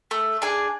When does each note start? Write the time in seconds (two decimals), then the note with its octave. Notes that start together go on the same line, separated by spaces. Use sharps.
0.11 A3
0.42 D4 G#4